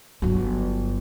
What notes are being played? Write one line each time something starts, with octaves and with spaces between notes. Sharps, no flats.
G1 F#3